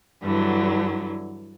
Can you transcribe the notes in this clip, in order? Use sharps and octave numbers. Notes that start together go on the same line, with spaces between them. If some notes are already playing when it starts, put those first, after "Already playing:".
G2 D3 E3 F#3